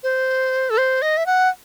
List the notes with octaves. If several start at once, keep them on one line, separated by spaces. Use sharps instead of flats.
C5
A4
C5
D#5
E5
F#5